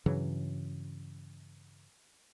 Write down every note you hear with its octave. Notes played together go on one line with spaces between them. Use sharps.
G2 C#3 E3 F#3